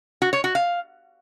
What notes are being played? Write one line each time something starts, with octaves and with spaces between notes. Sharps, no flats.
F#4
C#5
F#4
F5